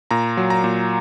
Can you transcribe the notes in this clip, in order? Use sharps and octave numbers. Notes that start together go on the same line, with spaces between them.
A#2 A#5
F#3
A#5
A#2